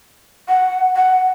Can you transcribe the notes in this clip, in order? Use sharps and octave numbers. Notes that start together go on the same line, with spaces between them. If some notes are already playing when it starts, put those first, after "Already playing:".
F#5
F#5